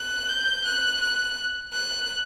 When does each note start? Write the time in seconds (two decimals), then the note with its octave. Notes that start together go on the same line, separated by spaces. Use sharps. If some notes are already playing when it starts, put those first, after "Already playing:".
Already playing: F#6
0.29 G6
0.65 F#6
1.01 F#6
1.73 F#6